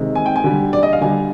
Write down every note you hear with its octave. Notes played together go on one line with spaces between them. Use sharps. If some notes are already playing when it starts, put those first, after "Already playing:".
Already playing: C3 D#3 G#3
G#5
G5
G#5
D3 G3
D5
D#5
F5
D3 G3 G#5